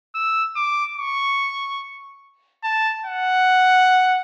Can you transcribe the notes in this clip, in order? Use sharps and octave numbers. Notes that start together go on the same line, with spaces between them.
E6
D6
C#6
A5
F#5